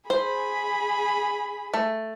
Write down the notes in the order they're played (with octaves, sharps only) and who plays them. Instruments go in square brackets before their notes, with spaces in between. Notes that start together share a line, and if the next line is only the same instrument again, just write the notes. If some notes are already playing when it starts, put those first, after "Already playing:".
[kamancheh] G#4 B5 [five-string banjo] C5
[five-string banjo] A3